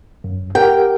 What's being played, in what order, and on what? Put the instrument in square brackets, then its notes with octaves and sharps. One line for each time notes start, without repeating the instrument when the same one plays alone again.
[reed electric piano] F#2
[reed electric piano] G4 A#4 F#5 [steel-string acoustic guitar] G5